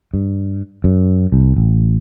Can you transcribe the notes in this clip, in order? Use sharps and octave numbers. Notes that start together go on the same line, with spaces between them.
G2
F#2
C2
A1